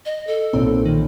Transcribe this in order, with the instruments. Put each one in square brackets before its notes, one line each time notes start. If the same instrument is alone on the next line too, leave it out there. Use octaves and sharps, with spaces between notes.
[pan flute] D#5
A4
[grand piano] B1 A#2 [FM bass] C4
[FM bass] D#3